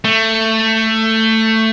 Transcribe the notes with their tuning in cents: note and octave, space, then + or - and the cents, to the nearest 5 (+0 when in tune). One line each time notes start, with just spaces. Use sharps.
A3 +15